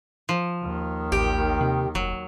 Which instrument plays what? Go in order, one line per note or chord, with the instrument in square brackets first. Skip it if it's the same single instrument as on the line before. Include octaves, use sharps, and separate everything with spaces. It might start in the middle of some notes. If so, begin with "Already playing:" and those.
[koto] F3
[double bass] D#2 D#3
[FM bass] A1 [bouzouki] G4
[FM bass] C3
[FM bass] F1 [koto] F#3